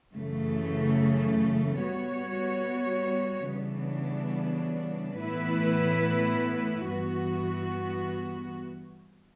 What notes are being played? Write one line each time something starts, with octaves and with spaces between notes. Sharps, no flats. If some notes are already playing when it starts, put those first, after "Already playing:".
F#2 C#3 E3 A3
G3 B3 F#4 C#5
C#3 E3 G3 B3 D4
A2 E3 B3 E4 B4
G2 E3 B3 F#4